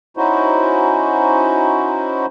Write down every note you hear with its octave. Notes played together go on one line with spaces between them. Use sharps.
C#4 D#4 E4 F#4 C5